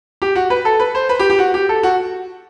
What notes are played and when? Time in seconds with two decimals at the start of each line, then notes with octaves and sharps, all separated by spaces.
0.22 G4
0.35 F#4
0.50 B4
0.65 A4
0.80 B4
0.95 C5
1.09 B4
1.19 G4
1.30 G4
1.39 F#4
1.54 G4
1.69 A4
1.83 F#4